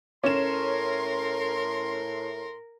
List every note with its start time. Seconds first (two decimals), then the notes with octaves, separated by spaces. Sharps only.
0.24 A2 C#4 A#4 C6 E7